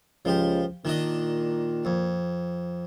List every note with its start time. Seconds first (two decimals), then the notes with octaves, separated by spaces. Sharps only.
0.25 C#2 F3 G4
0.85 A#2 D#3 D4 D#5
1.85 F2